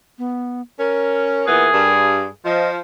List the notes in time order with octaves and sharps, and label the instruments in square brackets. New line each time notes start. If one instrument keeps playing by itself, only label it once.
[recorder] B3
[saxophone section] C#4 [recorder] A#4
[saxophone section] A#2 E3 B3 [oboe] G#4
[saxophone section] G2
[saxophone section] F3 [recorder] D#5